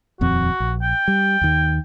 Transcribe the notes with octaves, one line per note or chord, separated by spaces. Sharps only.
D#1 F2 C4 F#4
A#1
G5
G3
D#2 D#3